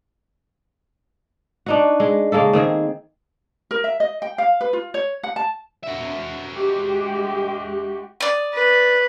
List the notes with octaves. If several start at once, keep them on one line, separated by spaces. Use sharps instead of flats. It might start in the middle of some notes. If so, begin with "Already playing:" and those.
D4 D#4 F#4
G#3
C#3 G#3 A#3 A4
D#3 C4 G#4
A#4
E5
D#5
G5
F5
B4
F4
C#5
F#5
A5
F#4 E5
G#3 G4
D5 D#6
B4